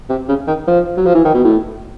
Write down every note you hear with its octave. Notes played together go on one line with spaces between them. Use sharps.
C3
C#3
D#3
F3
F#3
F3
E3
D#3
B2
A2